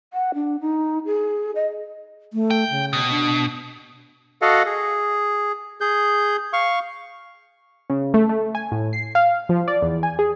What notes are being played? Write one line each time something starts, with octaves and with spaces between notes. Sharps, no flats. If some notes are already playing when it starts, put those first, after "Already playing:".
F#5
D4
D#4
G#4
D#5
A3
G5
C#3
B2
D4
F#4 A4 D#5 F5 F#5
G#4
G#4 G6
F5 C#6
C#3
A3
A3
G#5
A2
C7
F5
F3
D5
E2
G#5
G#4